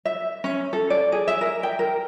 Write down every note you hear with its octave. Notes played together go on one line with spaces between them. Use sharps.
E5
C#4
A4
D5
G#4
E5
A#4
G5
A#4